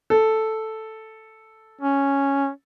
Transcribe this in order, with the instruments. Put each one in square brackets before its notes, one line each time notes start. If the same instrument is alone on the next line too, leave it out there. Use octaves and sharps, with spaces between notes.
[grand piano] A4
[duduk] C#4